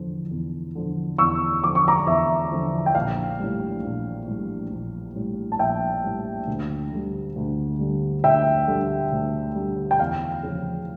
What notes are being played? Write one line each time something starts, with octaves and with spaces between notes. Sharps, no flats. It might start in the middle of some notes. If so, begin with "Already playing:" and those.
Already playing: E2 D3 F3
E2
D3 F3
E2 C#6 E6
D3 F3 D6
C#6
A#5 D6
E2 E5
D3 F3
G5
A#1 F5
A2 G3
A#1
A2 G3
A#1
A2 G3
A5
A#1 E5 G5
A2 G3
D2
D3 G3
D2
D3 G3
D2 E5 G5
D3 G3
D2
D3 G3
G5
E2 F5
C#3 F3